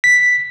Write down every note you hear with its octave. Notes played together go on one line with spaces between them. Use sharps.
B6